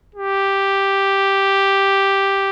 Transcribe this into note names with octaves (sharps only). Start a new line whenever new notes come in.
G4